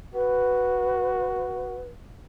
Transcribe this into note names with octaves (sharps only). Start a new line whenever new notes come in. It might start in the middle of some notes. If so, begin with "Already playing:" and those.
F#4 B4